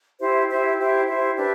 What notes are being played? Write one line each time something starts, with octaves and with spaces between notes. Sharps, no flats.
E4 G4 C5 E5
E4 G4 C5 E5
E4 G4 C5 E5
E4 G4 C5 E5
D4 G4 B4 E5